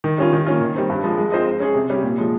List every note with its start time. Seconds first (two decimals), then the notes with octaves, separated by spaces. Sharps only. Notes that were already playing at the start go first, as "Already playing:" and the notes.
0.04 D#3
0.18 G3 C#4 F4
0.33 D#3
0.47 A#3 C#4 F4
0.61 D#3
0.76 G3 C4
0.90 G2
1.04 F3 G#3
1.18 G#3
1.32 C4 F4 C5 D#5
1.47 G#3
1.60 C#4 G#4
1.75 C3
1.90 G3 C#4 G4
2.03 A#2
2.18 F3 G#3